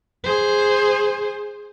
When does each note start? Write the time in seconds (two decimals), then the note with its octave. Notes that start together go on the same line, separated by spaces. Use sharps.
0.24 G#4 C5